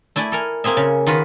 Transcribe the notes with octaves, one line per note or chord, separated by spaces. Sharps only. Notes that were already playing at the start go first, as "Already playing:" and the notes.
A3 E4 D5 G#5
A4 A#4 G#5
A#3 C4 G#4 E5
C#3
D#3 F4 F#4 B4